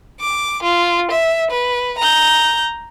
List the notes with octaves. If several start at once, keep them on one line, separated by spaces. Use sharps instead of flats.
D6
F4
E5
B4
A#5 G6